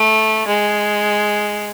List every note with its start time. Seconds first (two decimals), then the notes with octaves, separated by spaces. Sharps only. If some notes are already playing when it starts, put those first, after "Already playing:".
Already playing: A3
0.47 G#3